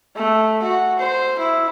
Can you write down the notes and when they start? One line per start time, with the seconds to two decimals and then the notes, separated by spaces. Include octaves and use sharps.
0.16 A3
0.63 F#4
0.99 C5
1.39 E4